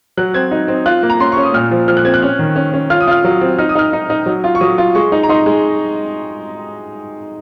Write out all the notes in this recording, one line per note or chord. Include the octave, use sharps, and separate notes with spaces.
F#3 F#6
C4 G#6
D#4
C4
F4 F#6
A#3
A#5
C#4 C6
C#4 C#6
D#6
A#2 F6
F3
F3 F6
F#6
C4 G#6
F#6
C#4
D#3
C#4
C#4
F4 F6
D#6
F4 F6
F#3
C4
D#4 F6
D#6
D#4 F6
D#4
D#4
F#3
F4
C#6
F#3 D#6
F4
G#3 C#6
D#4
A#5
D#4 C6
G#3